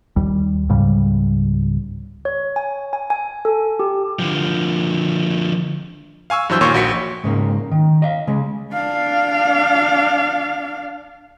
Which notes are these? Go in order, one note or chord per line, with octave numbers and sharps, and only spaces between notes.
D#2 G3
C#2 G#2 C#3 G3
C#5
G#5
G#5
G#5
A4
G4
D3 F3
F5 G#5 C#6 E6
G2 E3 F#3 C5 E6 G6
D#2 A#2 C#5 C6 C#6
A#1 F#4 B6 C#7
G#2 C#3 A#3
D#3
D#5 F5
C#3 G#3
D4 F5